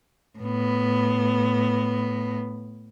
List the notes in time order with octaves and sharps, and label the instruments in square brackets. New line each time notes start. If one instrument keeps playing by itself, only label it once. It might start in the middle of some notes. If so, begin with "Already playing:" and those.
[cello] A2 B3